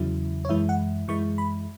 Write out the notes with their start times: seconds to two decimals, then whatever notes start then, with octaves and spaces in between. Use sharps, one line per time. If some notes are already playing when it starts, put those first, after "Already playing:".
Already playing: E2 C#3 F#3 E4
0.45 C#5
0.49 F#2 E3 G#3 E4 E5
0.69 F#5
1.08 F#2 E3 G#3 E4 C#6
1.38 B5